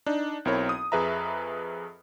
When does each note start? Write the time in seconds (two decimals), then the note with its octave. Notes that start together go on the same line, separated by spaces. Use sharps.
0.06 D4 D#4
0.45 B1 C4 E4 A#4 C#5
0.69 D#6
0.92 F2 G#4 B4 E5 A#5